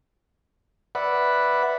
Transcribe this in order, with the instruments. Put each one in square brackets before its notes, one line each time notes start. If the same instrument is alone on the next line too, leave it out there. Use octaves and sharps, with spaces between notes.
[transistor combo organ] B4 D5 E5 F#5 B5